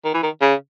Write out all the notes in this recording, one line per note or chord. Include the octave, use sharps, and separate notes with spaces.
D#3
E3
D#3
C#3